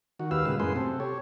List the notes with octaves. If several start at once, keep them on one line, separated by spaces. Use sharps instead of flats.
D#3 F#4
D#2 G4 B4 F5 E6
A#2 C#3 G#3 B4
F#2 A2 A#3 G#4 B4 C6
C3 C4 A4
G4 C#5